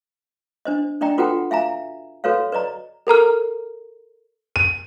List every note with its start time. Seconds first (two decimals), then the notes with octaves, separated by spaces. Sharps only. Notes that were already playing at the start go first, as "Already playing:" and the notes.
0.65 D4 C5 D#5
1.01 D4 D5 D#5 G5 A#5
1.18 F4 F#4 A4 B4 F#5 G5
1.51 E5 F5 G#5 A#5
2.24 F#4 A4 B4 C#5 F5
2.52 B4 D5 D#5 A#5
3.07 A4 A#4 A#5 F6
4.56 D#7